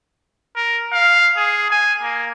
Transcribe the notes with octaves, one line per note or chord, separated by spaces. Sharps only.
A#4
F5
G#4
G#5
A#3